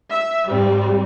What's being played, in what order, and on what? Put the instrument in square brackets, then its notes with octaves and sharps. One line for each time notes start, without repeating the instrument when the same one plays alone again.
[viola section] E5
[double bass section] G#2 [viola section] G3 C4